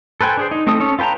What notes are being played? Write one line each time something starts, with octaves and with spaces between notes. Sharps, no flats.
A4 B4 C5 G5 G#5
D4 G#4 C5
D#4
A3 C4 D#4 A4 D#6
C#4 A4 C#5
F4 B4 G5 A5 A#5